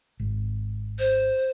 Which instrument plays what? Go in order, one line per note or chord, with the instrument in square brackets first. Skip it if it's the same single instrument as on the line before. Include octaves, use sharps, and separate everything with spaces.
[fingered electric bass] G#1
[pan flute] C5